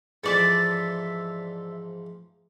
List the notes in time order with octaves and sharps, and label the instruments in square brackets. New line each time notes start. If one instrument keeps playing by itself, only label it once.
[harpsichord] G#2 E3 F3 [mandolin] A4 D5 E5